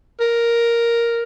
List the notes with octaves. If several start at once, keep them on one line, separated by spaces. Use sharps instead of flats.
A#4